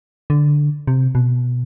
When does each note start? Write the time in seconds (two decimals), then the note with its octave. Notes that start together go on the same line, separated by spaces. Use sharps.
0.30 D3
0.87 C3
1.15 B2